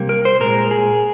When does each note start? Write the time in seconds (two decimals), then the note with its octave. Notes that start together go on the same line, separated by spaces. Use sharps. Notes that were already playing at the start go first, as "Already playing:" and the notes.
Already playing: C3 G3 A#3
0.09 A#4
0.25 C5
0.40 A#2 G#3 A#4
0.71 G#4